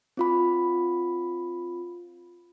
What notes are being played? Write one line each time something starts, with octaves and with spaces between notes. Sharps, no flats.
C4 F4 B5